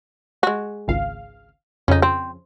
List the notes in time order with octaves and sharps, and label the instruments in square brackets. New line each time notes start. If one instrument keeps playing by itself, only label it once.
[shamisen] G#3 F#4
[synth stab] G#1 C#2 F5
[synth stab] F2 C#3 [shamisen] C#4 D#4
[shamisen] C4